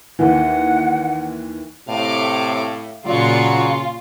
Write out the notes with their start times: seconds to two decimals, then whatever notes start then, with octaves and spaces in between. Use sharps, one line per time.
0.19 D#2 E3 F#5
1.89 A2 C3 F5 D6
3.06 A#2 C#3 F#3 F4 D5 C#6
3.55 F4